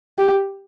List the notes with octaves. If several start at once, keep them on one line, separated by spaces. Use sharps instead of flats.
G4